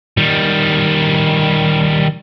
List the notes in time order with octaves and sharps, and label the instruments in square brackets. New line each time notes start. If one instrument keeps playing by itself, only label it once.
[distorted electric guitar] D#3 G3